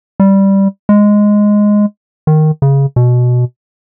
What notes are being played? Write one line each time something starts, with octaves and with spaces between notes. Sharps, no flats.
G3
G#3
D#3
C#3
B2